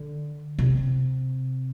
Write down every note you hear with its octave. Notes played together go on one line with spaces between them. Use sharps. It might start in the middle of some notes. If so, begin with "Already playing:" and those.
Already playing: D3
C3